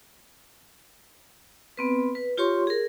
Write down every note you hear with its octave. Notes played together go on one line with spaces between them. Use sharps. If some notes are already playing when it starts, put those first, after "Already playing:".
B3 C4 B4
B4
F4 G4 C#5 C6 C#6
G#4 A#4